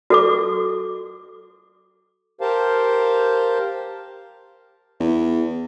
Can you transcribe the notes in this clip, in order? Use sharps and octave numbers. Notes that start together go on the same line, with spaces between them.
F#4 A4 D6
G4 A#4 C5 F5 A5
E2